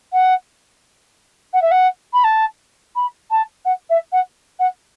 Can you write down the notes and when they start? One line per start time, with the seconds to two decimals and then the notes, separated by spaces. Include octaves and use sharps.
0.13 F#5
1.53 F#5
1.62 E5
1.71 F#5
2.14 B5
2.24 A5
2.96 B5
3.31 A5
3.65 F#5
3.90 E5
4.12 F#5
4.59 F#5